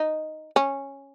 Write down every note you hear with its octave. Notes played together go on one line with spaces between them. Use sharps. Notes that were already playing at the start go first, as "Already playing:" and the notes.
Already playing: D#4
C#4